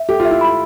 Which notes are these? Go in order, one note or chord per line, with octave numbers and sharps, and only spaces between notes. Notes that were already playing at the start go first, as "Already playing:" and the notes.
Already playing: E5
G4 A4
F4
E5
E4
B5